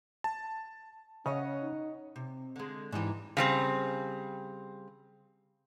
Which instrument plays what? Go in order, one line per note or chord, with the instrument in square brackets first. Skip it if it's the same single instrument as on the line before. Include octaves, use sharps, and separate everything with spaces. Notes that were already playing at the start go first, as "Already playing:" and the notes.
[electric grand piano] A5
[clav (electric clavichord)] C#3 [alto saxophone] C#4 [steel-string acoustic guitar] C#5 D#5 F#5
[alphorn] D#4
[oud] C3
D3 G#3
[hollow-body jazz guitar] G#2 E3 [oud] D4 D#4 G4
[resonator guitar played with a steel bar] C#3 G3 C4